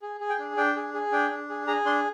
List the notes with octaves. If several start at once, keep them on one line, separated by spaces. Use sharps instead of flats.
G#4
G#4
G5
D4
D4 G5
G#4
G#4
D4 G5
D4
G#4
G#4 A#5
D4 C6